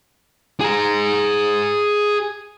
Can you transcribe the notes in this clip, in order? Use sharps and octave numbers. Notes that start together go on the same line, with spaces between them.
G#4 A#5